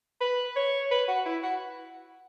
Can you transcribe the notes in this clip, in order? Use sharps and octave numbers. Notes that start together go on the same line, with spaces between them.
B4
C#5
B4
F#4
E4
F#4